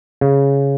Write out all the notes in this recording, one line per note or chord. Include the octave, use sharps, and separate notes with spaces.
C#3